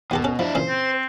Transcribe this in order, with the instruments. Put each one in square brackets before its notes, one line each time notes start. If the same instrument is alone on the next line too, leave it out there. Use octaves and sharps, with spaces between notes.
[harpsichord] D#2 G4 A4 [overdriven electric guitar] B2
[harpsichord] C#4 A4
[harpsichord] F3 [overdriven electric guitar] D4 E4
[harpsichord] A#2 C#3 E3 [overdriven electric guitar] C5
[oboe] C4